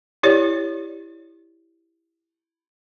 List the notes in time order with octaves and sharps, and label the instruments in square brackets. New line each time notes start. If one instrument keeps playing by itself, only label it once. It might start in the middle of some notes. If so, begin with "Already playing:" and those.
[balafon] E4 G4 C#5 D5